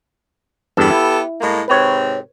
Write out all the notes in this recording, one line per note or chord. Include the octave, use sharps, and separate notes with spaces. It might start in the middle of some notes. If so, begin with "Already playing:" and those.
E2 G2 B3 G4 A4
E4
A2 G#3 A#3
G#2 C3 C4 B4 C#5